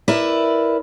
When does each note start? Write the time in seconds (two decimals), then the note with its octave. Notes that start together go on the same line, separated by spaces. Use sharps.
0.08 E4 A#4 B4 D5 E5